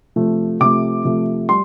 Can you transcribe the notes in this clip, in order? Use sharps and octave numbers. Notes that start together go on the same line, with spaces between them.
C3 F3 A3
C3 F3 A3 D6
C3 F3 A3
G3 C6